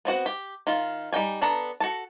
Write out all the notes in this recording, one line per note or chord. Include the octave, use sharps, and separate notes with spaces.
B3 C4 F#4 F#5
G4
D#3 F4
G3 D#4 G5 G#5
B3 D4 A4 A#5
F#4 A4 A5